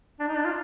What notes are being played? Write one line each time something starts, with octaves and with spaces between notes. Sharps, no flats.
D4
D#4
D4
F4